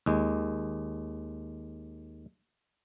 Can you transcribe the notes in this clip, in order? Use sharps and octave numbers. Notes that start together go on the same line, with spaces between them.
D#2 G#3